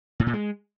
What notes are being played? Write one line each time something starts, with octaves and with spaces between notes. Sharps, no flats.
A2
A#2
G#3